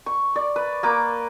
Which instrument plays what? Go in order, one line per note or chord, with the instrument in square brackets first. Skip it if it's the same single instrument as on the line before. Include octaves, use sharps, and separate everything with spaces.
[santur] C#6
D5
B4
A#3 B4 D6